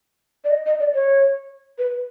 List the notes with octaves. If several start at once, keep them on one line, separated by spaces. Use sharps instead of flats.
D5
D#5
D#5
D5
C#5
B4